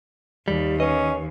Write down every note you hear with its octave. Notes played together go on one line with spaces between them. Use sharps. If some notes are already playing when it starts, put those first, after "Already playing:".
D#2 G3
C#4 B4 D#5